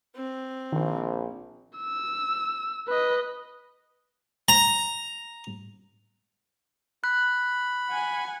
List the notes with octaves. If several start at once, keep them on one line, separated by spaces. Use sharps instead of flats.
C4
A#1 D#3
E6
B4 D#5
A#5
B5 F#6
F#5 G#5